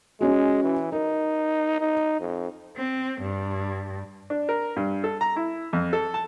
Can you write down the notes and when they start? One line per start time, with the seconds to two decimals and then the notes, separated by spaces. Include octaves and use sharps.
0.21 G#3 C#4 F#4
0.63 E3
0.92 D#4 A#4
1.80 D#4
2.20 F2
2.76 C4
3.21 G2
4.30 D4
4.49 A#4
4.76 G2
5.04 A4
5.21 A#5
5.36 E4
5.73 F2
5.93 A4
6.14 A5